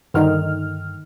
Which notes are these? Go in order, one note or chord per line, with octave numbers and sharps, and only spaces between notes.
G2 D3 D#3 D#4 F6